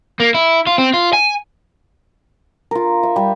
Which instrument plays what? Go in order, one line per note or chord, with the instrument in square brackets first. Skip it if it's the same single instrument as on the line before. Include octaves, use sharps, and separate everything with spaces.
[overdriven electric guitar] A#3
E4
F4
C4
F4
G#5
[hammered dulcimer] F4 A#4
E5
G3